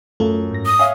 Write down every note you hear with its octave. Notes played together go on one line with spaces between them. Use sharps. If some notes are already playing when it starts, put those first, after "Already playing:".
F#2 A3 F4 A4
G#2 A#6
D#6
C#5 E5 F5 G#5